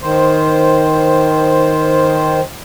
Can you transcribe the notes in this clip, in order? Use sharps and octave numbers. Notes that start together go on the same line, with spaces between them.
D#3 C5